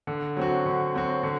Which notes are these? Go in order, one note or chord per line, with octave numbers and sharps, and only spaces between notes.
D3
F#3 C4 F#4
D3
F#3 C4 F#4
D3